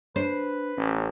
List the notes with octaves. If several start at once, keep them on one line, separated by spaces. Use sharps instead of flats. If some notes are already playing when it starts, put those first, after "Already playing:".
D4 B4 C5
A1 C#4